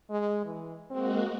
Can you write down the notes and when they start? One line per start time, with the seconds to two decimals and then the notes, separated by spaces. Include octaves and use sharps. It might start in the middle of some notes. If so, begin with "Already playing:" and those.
0.10 G#3
0.45 E3
0.90 G#3 A#3 C4 F#4